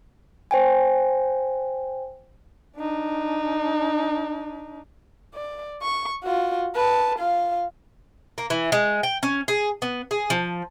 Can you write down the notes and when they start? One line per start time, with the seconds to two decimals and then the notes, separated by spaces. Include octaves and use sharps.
0.51 C5 G5 G#5
2.77 D4 D#4
5.34 D5
5.82 C#6
6.24 F4 F#4
6.76 B4 A5
7.19 F4 F5
8.38 A#3
8.50 E3
8.72 G#3
9.03 G5
9.23 C#4
9.48 G#4
9.82 B3
10.11 G#4
10.30 F3